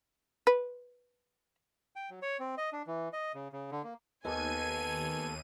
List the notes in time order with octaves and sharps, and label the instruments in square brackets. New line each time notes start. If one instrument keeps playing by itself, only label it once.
[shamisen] B4
[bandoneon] G5
F#3
C#5
C4
D#5
D4
E3
D#5
C#3
C#3
D3
A#3
[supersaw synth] D#2 D#7 [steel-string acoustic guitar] B3 D#5 [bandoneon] A4 [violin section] G#5 G#6